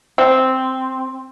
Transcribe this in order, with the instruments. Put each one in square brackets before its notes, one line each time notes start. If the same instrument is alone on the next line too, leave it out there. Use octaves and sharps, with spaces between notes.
[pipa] C4